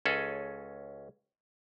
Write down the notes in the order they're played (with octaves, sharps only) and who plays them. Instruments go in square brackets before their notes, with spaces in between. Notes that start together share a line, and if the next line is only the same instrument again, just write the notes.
[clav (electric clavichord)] C#2 C#4 G#4 A4